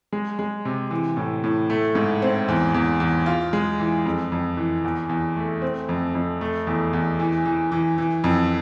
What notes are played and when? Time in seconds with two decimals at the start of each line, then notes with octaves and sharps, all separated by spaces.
0.13 G#3
0.39 G#3
0.65 C3
0.90 E3
1.17 A2
1.44 A2
1.70 A3
1.95 G#2
2.22 C4
2.48 E2
2.74 E2
3.00 E2
3.26 F4
3.53 G#3
3.80 E3
4.05 F2
4.32 F2
4.57 E3
4.84 E2
5.09 E2
5.37 A3
5.62 C4
5.89 F2
6.15 F2
6.41 A3
6.67 E2
6.93 E2
7.19 E3
7.46 E3
7.72 E3
7.98 E3
8.24 F2